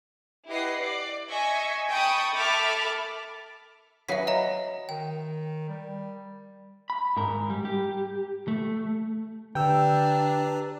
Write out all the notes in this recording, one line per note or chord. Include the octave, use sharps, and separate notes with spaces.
E4 G4 B4 D#5 F#5 C7
D5
D#5 E5 G#5 C#6
G5 A5 B5 C#6 D#6
A4 E5 A5 B5 D6 F6
F#3 G#4 B4 E5 F5 B6
D#5 E5 A#5
D#3 G5
G3
B5
G#2 A#4
G3
G4
A3
D3 D4 G4 B4 G5 A#5 E6